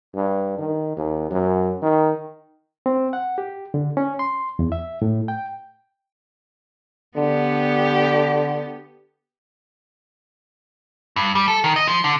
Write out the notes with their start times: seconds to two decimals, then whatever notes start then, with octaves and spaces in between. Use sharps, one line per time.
0.15 G2
0.58 D#3
0.97 D#2
1.31 F#2
1.82 D#3
2.86 C4
3.13 F#5
3.38 G4
3.74 D3
3.97 C#4
4.19 C6
4.59 E2
4.72 E5
5.02 A2
5.28 G5
7.17 D3 B3 G4
11.16 G2
11.35 G3
11.48 A4
11.64 D#3
11.76 D#5
11.87 F3
12.04 D3